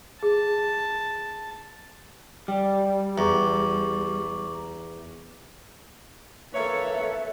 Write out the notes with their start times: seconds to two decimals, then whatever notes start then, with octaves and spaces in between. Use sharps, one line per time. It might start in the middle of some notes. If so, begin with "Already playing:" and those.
0.23 G#4 A5
2.48 G3 D5 G5
3.18 E2 A#5 C#6 D6
6.54 A#3 A4 B4 C#5 E5